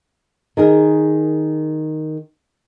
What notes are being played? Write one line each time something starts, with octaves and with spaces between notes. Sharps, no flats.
D#3 G#4 A#4